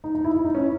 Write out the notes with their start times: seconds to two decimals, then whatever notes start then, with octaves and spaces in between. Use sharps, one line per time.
0.04 D#4
0.15 D#4
0.24 E4
0.35 E4
0.45 D#4
0.55 C#4